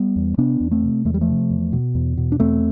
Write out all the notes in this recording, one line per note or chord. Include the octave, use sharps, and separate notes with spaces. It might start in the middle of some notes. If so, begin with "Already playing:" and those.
Already playing: G3 B3
E2
C3 B3 D4
E2
A3 C4
C3
E2 A3
G3
F3 A3
C3
E2
B2
E2
B2
D4
E2 A3 C4